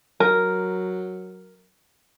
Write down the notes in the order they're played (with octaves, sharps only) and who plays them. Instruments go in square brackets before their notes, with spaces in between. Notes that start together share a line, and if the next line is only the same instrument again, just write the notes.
[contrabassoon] F#3 [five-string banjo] A#4